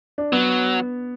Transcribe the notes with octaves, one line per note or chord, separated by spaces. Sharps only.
D4
F#3 B3